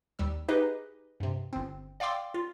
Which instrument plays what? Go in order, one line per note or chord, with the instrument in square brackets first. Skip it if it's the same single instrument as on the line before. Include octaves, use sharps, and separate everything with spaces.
[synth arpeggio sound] D#2 G3 E6
D#4 G4 G#4 B4 D#5
G2 C3
G1 C4
D5 F5 G5 C6 D6 E6
F4